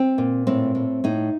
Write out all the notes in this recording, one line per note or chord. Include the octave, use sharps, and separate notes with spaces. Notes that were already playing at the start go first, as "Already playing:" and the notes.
Already playing: C4
A#2
A2 C4
A2
A2 D#4